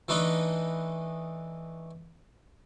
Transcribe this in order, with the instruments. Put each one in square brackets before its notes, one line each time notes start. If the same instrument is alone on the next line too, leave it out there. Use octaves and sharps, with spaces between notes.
[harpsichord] E3 A3 D4 D#4 B4 D#5